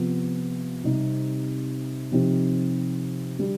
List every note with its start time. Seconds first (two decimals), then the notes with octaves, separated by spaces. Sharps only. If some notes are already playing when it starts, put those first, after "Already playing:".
Already playing: C3 F3 B3 F4
0.84 C3 G3 C4 D#4
2.12 C3 F3 C4 D#4 G4
3.39 D3 G3 D4 G4